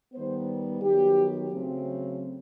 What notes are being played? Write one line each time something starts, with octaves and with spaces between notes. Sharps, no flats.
D#3 G3 B3 C5
D#3 F#3 B3 G4
C#3 F#3 A3 C4